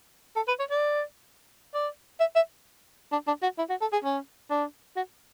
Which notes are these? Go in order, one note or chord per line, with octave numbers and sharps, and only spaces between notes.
A4
B4
C#5
D5
D5
E5
E5
D4
D4
F#4
E4
F#4
A4
G#4
C#4
D4
F#4